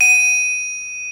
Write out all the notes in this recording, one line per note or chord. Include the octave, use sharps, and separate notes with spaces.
D#7